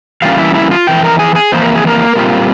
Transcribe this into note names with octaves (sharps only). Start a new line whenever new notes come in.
E3 G3 A#3 C#4 F4 F5
E4 E5
E4 E5
F4 F5
F2 E3 G5
A#4 A#5
G#4 G#5
G#4 G#5
F2 E3 A#3 E4 C5
A#4
G#4
A#3 A#4
A#2 G3 C4 F4